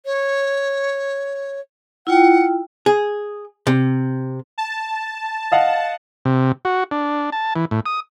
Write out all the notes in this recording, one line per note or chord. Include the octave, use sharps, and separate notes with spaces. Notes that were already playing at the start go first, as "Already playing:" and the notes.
C#5
E4 F4 F#5 G5
G#4
C3
A5
D#5 F5 F#5
C3
F#4
D4
A5
E3
A2
D#6